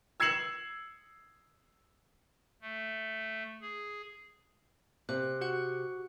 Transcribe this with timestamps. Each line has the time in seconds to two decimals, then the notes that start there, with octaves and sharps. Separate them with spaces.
0.20 E6 G#6 C7 C#7 E7 F#7
2.62 A3
3.62 G#4
5.09 C3 F#6
5.41 F#4 F#5 F#6